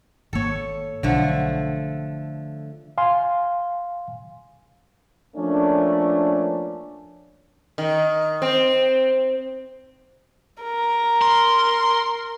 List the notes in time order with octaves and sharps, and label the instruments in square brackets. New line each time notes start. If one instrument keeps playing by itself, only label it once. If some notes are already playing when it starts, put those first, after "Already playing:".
[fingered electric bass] G#1 A#3 [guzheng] A4 C#5
[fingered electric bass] B1 [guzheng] D3 F3 A3
[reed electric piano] F5 G#5 C6
[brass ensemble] F3 A3 A#3 C#4 D4
[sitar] D#3
C4
[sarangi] A#4
[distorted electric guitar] C6